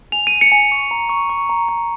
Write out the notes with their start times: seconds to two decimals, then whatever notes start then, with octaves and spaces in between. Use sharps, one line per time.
0.12 G#5 F7
0.27 D#7
0.32 G#5
0.41 C#7
0.52 G#5
0.72 C#6
0.91 A#5
1.09 C#6
1.30 C#6
1.49 A#5
1.69 A#5